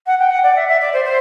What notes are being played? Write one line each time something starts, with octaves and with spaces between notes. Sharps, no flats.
F#5
G5
F#5
D5
E5
E5
D5
C5
C5